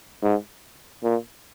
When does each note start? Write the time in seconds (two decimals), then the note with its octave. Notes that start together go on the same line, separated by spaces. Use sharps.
0.22 G#2
1.03 A#2